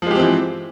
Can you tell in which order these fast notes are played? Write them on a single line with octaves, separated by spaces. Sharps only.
F3 G#3 G4 C4 E3